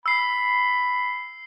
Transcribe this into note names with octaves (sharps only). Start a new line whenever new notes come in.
B5 E6 C7